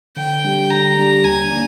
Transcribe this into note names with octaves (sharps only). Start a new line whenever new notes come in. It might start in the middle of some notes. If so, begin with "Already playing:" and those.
D3 G5
G3 D4 G4
D3 A#5
G3 D4 G4
D#2 G#5
A#3 D4